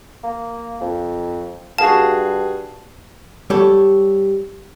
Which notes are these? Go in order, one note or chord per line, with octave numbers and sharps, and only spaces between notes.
A#3
F2
G2 F#4 G#4 F5 A5
G3 G4 A4 C#5